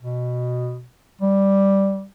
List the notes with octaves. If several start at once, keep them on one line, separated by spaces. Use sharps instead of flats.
B2
G3